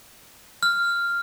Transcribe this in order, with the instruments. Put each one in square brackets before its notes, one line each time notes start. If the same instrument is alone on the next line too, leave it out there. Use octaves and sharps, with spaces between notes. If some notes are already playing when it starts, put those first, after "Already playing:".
[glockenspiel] F6